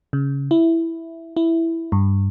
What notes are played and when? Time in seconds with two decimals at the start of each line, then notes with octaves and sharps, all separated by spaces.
0.13 C#3
0.51 E4
1.37 E4
1.92 G2